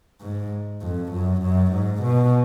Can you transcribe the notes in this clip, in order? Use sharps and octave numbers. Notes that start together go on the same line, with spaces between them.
G#2
F2
F#2
F#2
G#2
B2